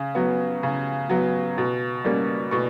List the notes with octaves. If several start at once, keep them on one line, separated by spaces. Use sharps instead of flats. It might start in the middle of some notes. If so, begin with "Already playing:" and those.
Already playing: C#3
F#3 B3
C#3
F#3 B3
B2
G3 A#3 C#4
B2 C#6